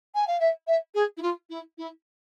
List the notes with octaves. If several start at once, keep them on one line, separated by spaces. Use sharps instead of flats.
G#5
F5
E5
E5
G#4
E4
F4
E4
E4